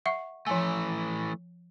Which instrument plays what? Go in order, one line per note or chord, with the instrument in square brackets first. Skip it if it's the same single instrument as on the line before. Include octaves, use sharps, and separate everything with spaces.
[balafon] E5 F#5 C#6
[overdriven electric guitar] E3 A3 [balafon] F3 G#5